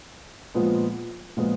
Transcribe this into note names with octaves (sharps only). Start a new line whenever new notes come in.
A#2 F3 G#3 B3
A#2 F3 G#3 B3